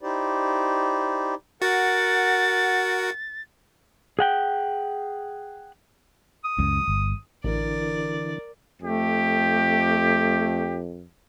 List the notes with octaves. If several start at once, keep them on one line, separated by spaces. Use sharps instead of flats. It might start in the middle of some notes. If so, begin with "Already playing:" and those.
D#4 E4 G4 C5 D5
F#4 A#4 F#5 A6
G#4 F#5 G5
D#6
C#2 F#2
G1
A1 D3 E3 A#4 D5
F2 A3 G4